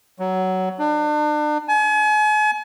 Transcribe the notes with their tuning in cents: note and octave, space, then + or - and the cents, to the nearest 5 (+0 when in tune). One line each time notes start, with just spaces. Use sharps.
F#3 +15
D4 +35
G#5 +40